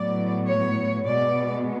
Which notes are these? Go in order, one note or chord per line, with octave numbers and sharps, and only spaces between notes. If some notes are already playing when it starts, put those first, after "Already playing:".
Already playing: A2 F#3 B3 D5
C#5
B2 G#3 B3 D5